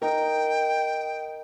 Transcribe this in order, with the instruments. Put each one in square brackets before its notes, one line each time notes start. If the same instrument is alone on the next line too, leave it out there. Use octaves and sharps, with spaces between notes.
[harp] D#4 A#4 [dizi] G5